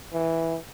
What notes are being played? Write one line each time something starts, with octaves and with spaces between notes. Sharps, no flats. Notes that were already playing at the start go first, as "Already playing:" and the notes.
E3